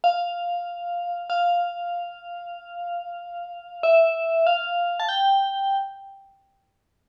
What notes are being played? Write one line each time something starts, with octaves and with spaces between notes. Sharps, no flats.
F5
F5
E5
F5
A5
G5